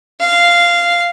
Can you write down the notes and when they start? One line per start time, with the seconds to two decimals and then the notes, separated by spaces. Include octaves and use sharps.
0.20 F5